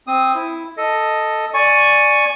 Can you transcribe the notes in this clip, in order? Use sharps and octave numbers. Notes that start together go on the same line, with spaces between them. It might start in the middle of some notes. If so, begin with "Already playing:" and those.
C4 D#6
E4
A4 D#5
D5 G#5 C#6